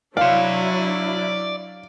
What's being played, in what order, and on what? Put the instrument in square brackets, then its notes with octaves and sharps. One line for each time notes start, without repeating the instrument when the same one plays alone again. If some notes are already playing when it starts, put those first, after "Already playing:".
[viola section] F#3 D4 E4 [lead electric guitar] D5 C6 [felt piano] F5